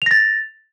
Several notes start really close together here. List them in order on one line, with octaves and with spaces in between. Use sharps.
F7 A#6 A6